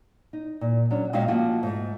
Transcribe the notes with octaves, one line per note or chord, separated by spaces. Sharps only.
D#4
A#2
F#3 C#4 D4
A#2 G#3 C4 F#4 E5 F5
F3 A3 A#3 F4 F#4
G#2 A3